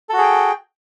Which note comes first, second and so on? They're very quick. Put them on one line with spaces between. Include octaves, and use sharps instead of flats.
A4 F#4 G#4 G5